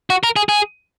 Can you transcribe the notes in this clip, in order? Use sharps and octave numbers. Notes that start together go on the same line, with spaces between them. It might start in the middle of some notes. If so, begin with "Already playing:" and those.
F#4
A#4
G#4
G#4